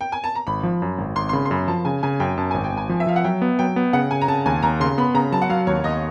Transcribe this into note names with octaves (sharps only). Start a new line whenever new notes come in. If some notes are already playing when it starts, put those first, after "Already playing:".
G5
G#5
A5
A#5
G#1 B5
F3
F#2
G#1
G#1 C6
C6
C#3 B5
C6
F#2 B5
F3 A5
C#3 G#5
C#3 G#5
F#2 G5
F#2 A5
G#1 G#5
G5
G#1
G#5
F3
E5
F3 F5
F#5
F#3 G5
B3
F#3 G5
B3
C#3 F#5
C#3 G#5
A#5
C#3 A5
D#2 G#5
D#2 A#5
C#3 C6
B3 B5
C#3 A#5
F#3 A5
F#5
F#3 F5
D#2 C#5
D#2 D#5